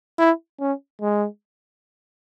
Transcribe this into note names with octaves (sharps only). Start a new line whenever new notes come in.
E4
C#4
G#3